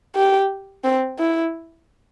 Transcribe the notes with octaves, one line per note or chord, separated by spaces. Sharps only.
G4
C4
E4